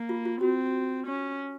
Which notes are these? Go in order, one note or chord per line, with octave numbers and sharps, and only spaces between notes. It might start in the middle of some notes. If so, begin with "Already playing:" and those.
Already playing: A#3
F4
F4
C4 F#4
C#4